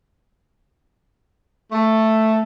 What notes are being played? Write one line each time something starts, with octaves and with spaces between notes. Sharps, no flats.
A3